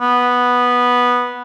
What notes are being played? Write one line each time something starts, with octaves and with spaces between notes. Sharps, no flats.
B3